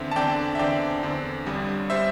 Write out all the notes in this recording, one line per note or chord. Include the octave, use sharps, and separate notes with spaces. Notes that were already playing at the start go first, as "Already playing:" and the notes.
Already playing: E2 D3 C4 E5
A5
E2 D3 C4 D5 G5
E5
E2 D3 C4 D5 G5
E2 D3 C4
G1 G2 G3
G3 C5 E5